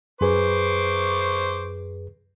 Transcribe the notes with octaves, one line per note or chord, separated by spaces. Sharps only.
F#2 G#4 B4 C5 C#6 D6